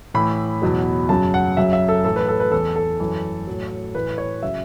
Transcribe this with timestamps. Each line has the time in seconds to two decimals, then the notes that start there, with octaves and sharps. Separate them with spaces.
0.14 A2 E3 B5
0.62 E2 B2 F#3
1.09 F#2 C#3 F#3 A5
1.34 F#5
1.57 F#2 C#3 F#3 E5
1.73 E5
1.88 A4
2.04 A2 E3 A4
2.16 B4
2.28 A4
2.40 B4
2.52 E2 E3 A4
2.76 A4
3.00 F#2 E3
3.47 A2 F#3
3.94 A2 E3 B4
4.18 C#5
4.42 C#3 F#3 E5